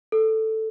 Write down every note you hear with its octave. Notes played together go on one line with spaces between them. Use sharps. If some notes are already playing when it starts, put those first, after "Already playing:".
A4